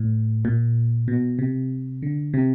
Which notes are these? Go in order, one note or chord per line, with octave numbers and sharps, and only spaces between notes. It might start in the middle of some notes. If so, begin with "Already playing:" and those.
Already playing: A2
A#2
B2
C3
D3
C3